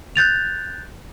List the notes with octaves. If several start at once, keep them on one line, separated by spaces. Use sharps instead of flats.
F#6 G6 A6 F7